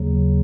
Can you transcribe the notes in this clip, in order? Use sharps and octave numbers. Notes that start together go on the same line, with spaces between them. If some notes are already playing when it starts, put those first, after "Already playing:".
Already playing: D#2 C#3 F#3